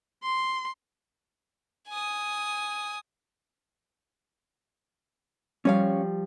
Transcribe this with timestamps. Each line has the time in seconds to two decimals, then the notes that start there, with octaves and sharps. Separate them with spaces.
0.23 C6
1.88 G#5 D#6
5.65 F3 G3 C#4 C#5 F5